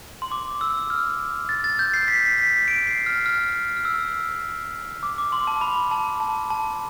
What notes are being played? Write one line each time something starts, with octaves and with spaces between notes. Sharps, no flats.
C6
D6
E6
F6
A6
A6
G6
C7
B6
B6
D7
C7
F6
F6
F6
E6
D6
D6
C6
A5
B5
A5
A5
A5